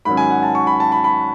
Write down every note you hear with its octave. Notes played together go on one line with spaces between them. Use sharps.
G#2 D#3 F#3 C#4 B5
G#5
F#5
A5
C#6
B5
A5
B5
B5